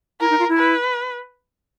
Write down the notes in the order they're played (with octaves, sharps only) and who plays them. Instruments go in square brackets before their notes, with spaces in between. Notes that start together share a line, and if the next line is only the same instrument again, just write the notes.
[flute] E4 [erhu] A#4
[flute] D#4
F4
E4
[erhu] B4